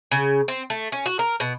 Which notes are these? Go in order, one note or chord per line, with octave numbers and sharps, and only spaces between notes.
C#3
C4
A3
C#4
F#4
A#4
B2